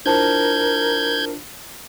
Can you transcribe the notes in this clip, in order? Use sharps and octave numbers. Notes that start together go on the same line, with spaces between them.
D4 E4 F4 A#4 C5 A5 G6 G#6